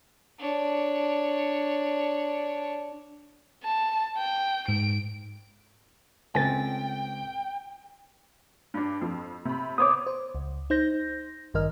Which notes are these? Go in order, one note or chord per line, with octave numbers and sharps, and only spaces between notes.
D4 C#5
A5
G5
G#2 D7
C#2 A3 C4 G5 G#5 A6
G2 D4
F2 F3
C3 B5
B3 C5 C#5 D6 D#6
C5
C#2
D#4 C5 G6 A#6
A1 G2 D#3 A#4 D#5 F6